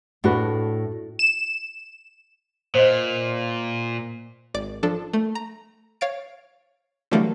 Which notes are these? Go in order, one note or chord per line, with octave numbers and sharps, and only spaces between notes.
A2 D4 F#4 B4
E7
A#2 C5 D#5
G#1 D5 D7
F3 D4 A4
A3
A#5
C#5 F5 A6 D7
D3 E3 F#3 G3 A3 A#3